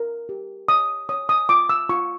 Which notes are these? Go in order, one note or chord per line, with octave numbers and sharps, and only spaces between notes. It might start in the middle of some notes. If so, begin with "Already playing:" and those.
Already playing: A#4
G4
C#5 D#6
C#5 D#6
D#6
F4 D6
E6
F4 C#6